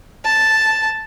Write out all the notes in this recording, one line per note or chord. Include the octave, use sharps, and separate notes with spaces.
A5